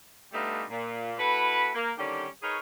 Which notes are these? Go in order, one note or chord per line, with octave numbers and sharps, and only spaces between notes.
G3 A3 B3 D4 D#4 F4
A#2
A3 E4 F#4 B4
A#3
D3 D#3 G3 C#4 G4
D#4 G#4 A#4 B4 C#5